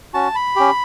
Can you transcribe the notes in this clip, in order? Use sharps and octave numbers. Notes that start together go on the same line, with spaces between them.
C#4 F#4 A5
B5
C#4 G4